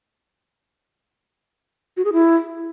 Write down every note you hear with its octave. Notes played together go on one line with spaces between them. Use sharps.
F#4
G#4
E4